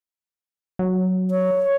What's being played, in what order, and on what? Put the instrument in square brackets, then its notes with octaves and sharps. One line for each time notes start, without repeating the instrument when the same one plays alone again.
[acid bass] F#3
[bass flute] C#5